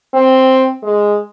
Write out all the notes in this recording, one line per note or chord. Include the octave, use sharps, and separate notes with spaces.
C4
G#3